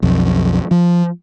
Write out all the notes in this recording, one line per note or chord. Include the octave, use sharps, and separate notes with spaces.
B1 F2
F3